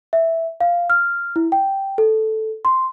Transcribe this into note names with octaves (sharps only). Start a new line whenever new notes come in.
E5
F5
F6
E4
G5
A4
C6